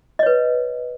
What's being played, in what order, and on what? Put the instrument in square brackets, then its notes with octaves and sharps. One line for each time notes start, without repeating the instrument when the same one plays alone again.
[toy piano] D#5
C#5
B4